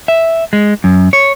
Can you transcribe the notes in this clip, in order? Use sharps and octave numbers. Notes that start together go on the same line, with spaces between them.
E5
G#3
F#2
C#5